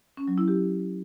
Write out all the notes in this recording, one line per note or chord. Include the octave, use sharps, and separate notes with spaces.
C#4
F#3
E4
G4